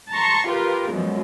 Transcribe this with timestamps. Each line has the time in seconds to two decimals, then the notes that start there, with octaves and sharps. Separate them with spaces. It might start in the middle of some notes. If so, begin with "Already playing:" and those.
0.12 A5 A#5 C6 C#6
0.49 F4 G4 A#4 B4
0.91 F#2 B2 F3 G#3